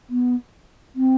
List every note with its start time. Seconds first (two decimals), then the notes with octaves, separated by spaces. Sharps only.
0.10 B3
0.96 C4